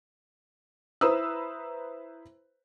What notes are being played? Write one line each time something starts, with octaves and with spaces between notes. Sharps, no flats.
E4 B4 C5 A#5 D#6 E6